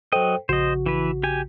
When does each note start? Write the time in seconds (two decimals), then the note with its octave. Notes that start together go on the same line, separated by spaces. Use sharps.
0.12 F#3 A4 C5 D#5 G5
0.49 A#1 C#3 F#4 C5 D#5
0.86 E3 B4
1.23 G4 G#5